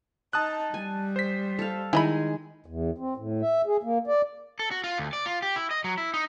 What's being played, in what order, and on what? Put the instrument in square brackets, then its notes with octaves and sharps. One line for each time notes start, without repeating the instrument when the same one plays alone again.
[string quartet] D#4 [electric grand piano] A5 D#6 F#6
[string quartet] G3 [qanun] G#5
[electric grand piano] C5 B6
[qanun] A4 F5
[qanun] D#3 G#3 [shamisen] E4 D#5 B5 [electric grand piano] G#5
[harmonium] E2
C4
A2
E5
G#4
A#3
D5
[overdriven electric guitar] A4
F#4
F4
D2
D5
F4
G4
E4
D#5
F#3
E4
D#4